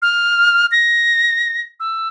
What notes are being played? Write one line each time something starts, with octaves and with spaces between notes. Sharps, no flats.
F6
A#6
E6